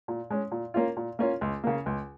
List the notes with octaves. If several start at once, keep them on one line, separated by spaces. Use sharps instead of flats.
A#2
G#3 C#4
A#2
A#3 C#4 F4
A#2
A#3 C#4 F4
C#2
C#3 A#3
C#2